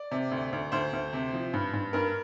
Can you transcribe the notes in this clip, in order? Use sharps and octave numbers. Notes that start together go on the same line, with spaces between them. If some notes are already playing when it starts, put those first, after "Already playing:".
Already playing: D5
C3
D2
D2
D2 C5
D2
C3
F3
G2
G2
G2 A#4